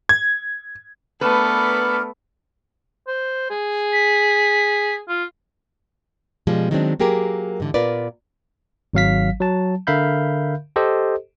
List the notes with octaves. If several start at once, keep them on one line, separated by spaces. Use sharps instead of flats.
G#6
A3 B3 D4 A#4 B4
C5
G#4
B6
F4
B2 F3 G3 G#3
D#3 F#3 G#3 A#3 C4 D4
F#3 A#3 G4 G#4 A#4
G#2 D3 E3
A#2 B3 F4 A#4 B4 D5
G#1 F#3 F5 B6
F#3 A5
D3 A#4 E5 F5 B5 G6
G4 A4 C5 D#5